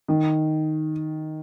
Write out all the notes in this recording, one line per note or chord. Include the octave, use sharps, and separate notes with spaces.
D#3